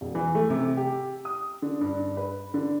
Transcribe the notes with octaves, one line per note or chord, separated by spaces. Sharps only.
E1
E3
A3
C3
G4
D#6
D3
G2
G2
B4
D3